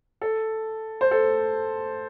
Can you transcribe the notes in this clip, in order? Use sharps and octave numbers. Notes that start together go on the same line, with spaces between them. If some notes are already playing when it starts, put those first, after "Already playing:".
A4
C5
A4